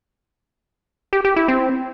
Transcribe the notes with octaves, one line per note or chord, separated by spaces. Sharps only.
G4
G4
E4
C4